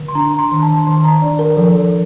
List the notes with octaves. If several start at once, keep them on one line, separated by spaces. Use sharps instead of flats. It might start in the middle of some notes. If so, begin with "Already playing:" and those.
Already playing: D3
C6
D4 A#5
A#5
C6
D#3
A5
D#3 C6
A#5
D4 D5
A#4
F3 A4